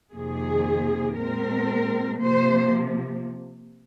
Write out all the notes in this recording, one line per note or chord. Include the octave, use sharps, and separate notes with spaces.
F2 C3 D#3 A#3 G#4
A#2 G#3 C4 A#4
C3 F3 A#3 C5